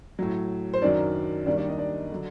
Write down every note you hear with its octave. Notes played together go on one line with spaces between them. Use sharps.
A2 F#3
C5
F#2 D#3 F#3 D4 D5
D#2 D#3 G3 D4 D5
D4 D5
D#4 D#5
D4 D5
D3 F#3